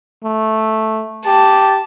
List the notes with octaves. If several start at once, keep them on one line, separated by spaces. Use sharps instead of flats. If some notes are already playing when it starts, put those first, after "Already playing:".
A3
G4 A5